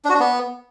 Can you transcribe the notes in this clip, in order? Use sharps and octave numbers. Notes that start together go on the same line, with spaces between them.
D4
F#4
D4
B3